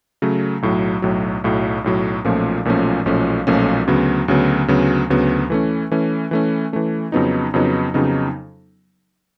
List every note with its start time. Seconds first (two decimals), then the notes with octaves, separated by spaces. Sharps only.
0.22 C#3 F#3 A3
0.62 B1 A2 F#3
1.02 B1 A2 F#3
1.44 B1 A2 F#3
1.84 B1 A2 F#3
2.25 B1 A#2 F3 A3 C#4
2.65 B1 A#2 F3 A3 C#4
3.06 B1 A#2 F3 A3 C#4
3.47 B1 A#2 F3 A3 C#4
3.88 D2 C#3 F#3 B3
4.28 D2 C#3 F#3 B3
4.68 D2 C#3 F#3 B3
5.10 D2 C#3 F#3 B3
5.50 E3 A3 C#4
5.91 E3 A3 C#4
6.31 E3 A3 C#4
6.73 E3 A3 C#4
7.12 F2 C#3 F#3 B3 D#4
7.54 F2 C#3 F#3 B3 D#4
7.94 F2 C#3 F#3 B3 D#4